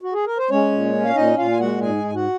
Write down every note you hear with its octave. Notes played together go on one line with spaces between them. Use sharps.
F#4
G#4
A#4
C5
G#3 C#4 C#5
A#2
C#4
F5
A#2 D#4 D#5
A#2 F4 F5
G#5
G#3 F#4 F#5
G#2 G#4 G#5
G#2 G#5
F#4 F#5